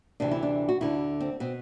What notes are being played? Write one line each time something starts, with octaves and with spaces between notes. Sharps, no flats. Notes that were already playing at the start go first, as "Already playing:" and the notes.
D2 C3 E3 D4
E4
D4
F#4
D2 D3 E4
C4
B2 C4